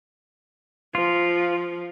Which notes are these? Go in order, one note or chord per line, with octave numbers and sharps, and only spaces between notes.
F3 F4